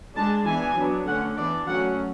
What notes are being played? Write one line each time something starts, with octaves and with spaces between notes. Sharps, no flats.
G#3 D4 A5
E3 B3 D4 G#5
F#3 B3 D4
D3 A3 C#4 F#5
E3 B3 D4 D5
F#3 A3 C#4 F#5